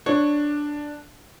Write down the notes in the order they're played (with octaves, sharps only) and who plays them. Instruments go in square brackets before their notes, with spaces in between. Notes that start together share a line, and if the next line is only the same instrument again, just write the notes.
[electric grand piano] D4 [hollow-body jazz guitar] C#5